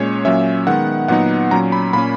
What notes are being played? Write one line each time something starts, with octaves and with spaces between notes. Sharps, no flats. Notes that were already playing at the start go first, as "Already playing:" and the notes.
Already playing: A#2 G#3 C#4 C#5
A#2 F#3 C#4 E5
D#3 G#3 B3 F#5
A#2 F#3 B3 D#4 F#5
A#2 F#3 C#4 A#5
B5
A#2 A#3 C#4 B5